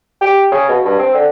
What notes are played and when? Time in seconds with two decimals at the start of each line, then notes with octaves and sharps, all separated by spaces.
0.21 G4
0.51 C#3
0.69 B2
0.85 G2
0.99 C4
1.14 D3